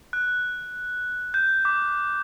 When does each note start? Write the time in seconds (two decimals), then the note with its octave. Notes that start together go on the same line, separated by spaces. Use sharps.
0.13 F#6
1.34 G6
1.65 D6